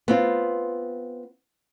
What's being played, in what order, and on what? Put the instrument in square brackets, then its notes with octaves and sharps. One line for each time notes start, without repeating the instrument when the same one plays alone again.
[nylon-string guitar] B3 C4 F4